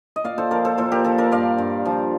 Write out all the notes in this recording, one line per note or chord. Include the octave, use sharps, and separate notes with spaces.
D#5
A#2 D5 F5
A4 C5
F3 A#4 D5
A4 C5
A#2 A4 C5
G4 A#4
F3 A4 C5
A#4 D5
G2 D5 F5
G2
F3